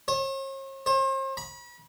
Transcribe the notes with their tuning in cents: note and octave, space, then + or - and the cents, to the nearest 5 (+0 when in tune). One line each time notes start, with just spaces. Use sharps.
C#5 -45
C5 +40
B5 -35